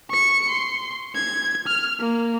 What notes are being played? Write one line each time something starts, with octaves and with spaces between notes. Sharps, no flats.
C#6 C#7
C6
G#6
F6
A#3